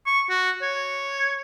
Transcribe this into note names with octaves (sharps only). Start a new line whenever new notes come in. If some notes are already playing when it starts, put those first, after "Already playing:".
C#6
F#4
C#5